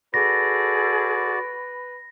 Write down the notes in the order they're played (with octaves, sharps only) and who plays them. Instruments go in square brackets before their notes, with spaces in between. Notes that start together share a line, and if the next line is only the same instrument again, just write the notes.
[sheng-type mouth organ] F#4 D5 [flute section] G#4 A4 [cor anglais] B4 [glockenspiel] A#6